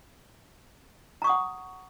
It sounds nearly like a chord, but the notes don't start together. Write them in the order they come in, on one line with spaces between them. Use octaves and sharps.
A#5 C#6 D#6 F#5